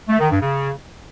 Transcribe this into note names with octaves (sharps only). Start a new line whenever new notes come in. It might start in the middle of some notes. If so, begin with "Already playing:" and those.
A3
D#3
G2
C#3